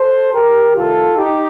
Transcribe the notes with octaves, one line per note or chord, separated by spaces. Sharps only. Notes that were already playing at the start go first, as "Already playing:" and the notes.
Already playing: A4 C5
G4 A#4
C2 C3 D#3 A3 F4 A4
D#4 G4